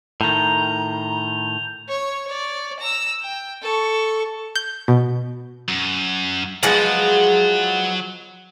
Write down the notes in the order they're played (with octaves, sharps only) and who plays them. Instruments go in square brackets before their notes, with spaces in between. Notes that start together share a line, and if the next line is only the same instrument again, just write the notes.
[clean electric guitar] A2 D#3 [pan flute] A#5 [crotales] G6 F7 G7
[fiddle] C#5
C#5 D5
A#5 E6
G5
A4 C#6
[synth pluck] G6
B2
[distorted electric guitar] F#2
[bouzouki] F3 G#3 B3 [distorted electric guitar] F#3 F#5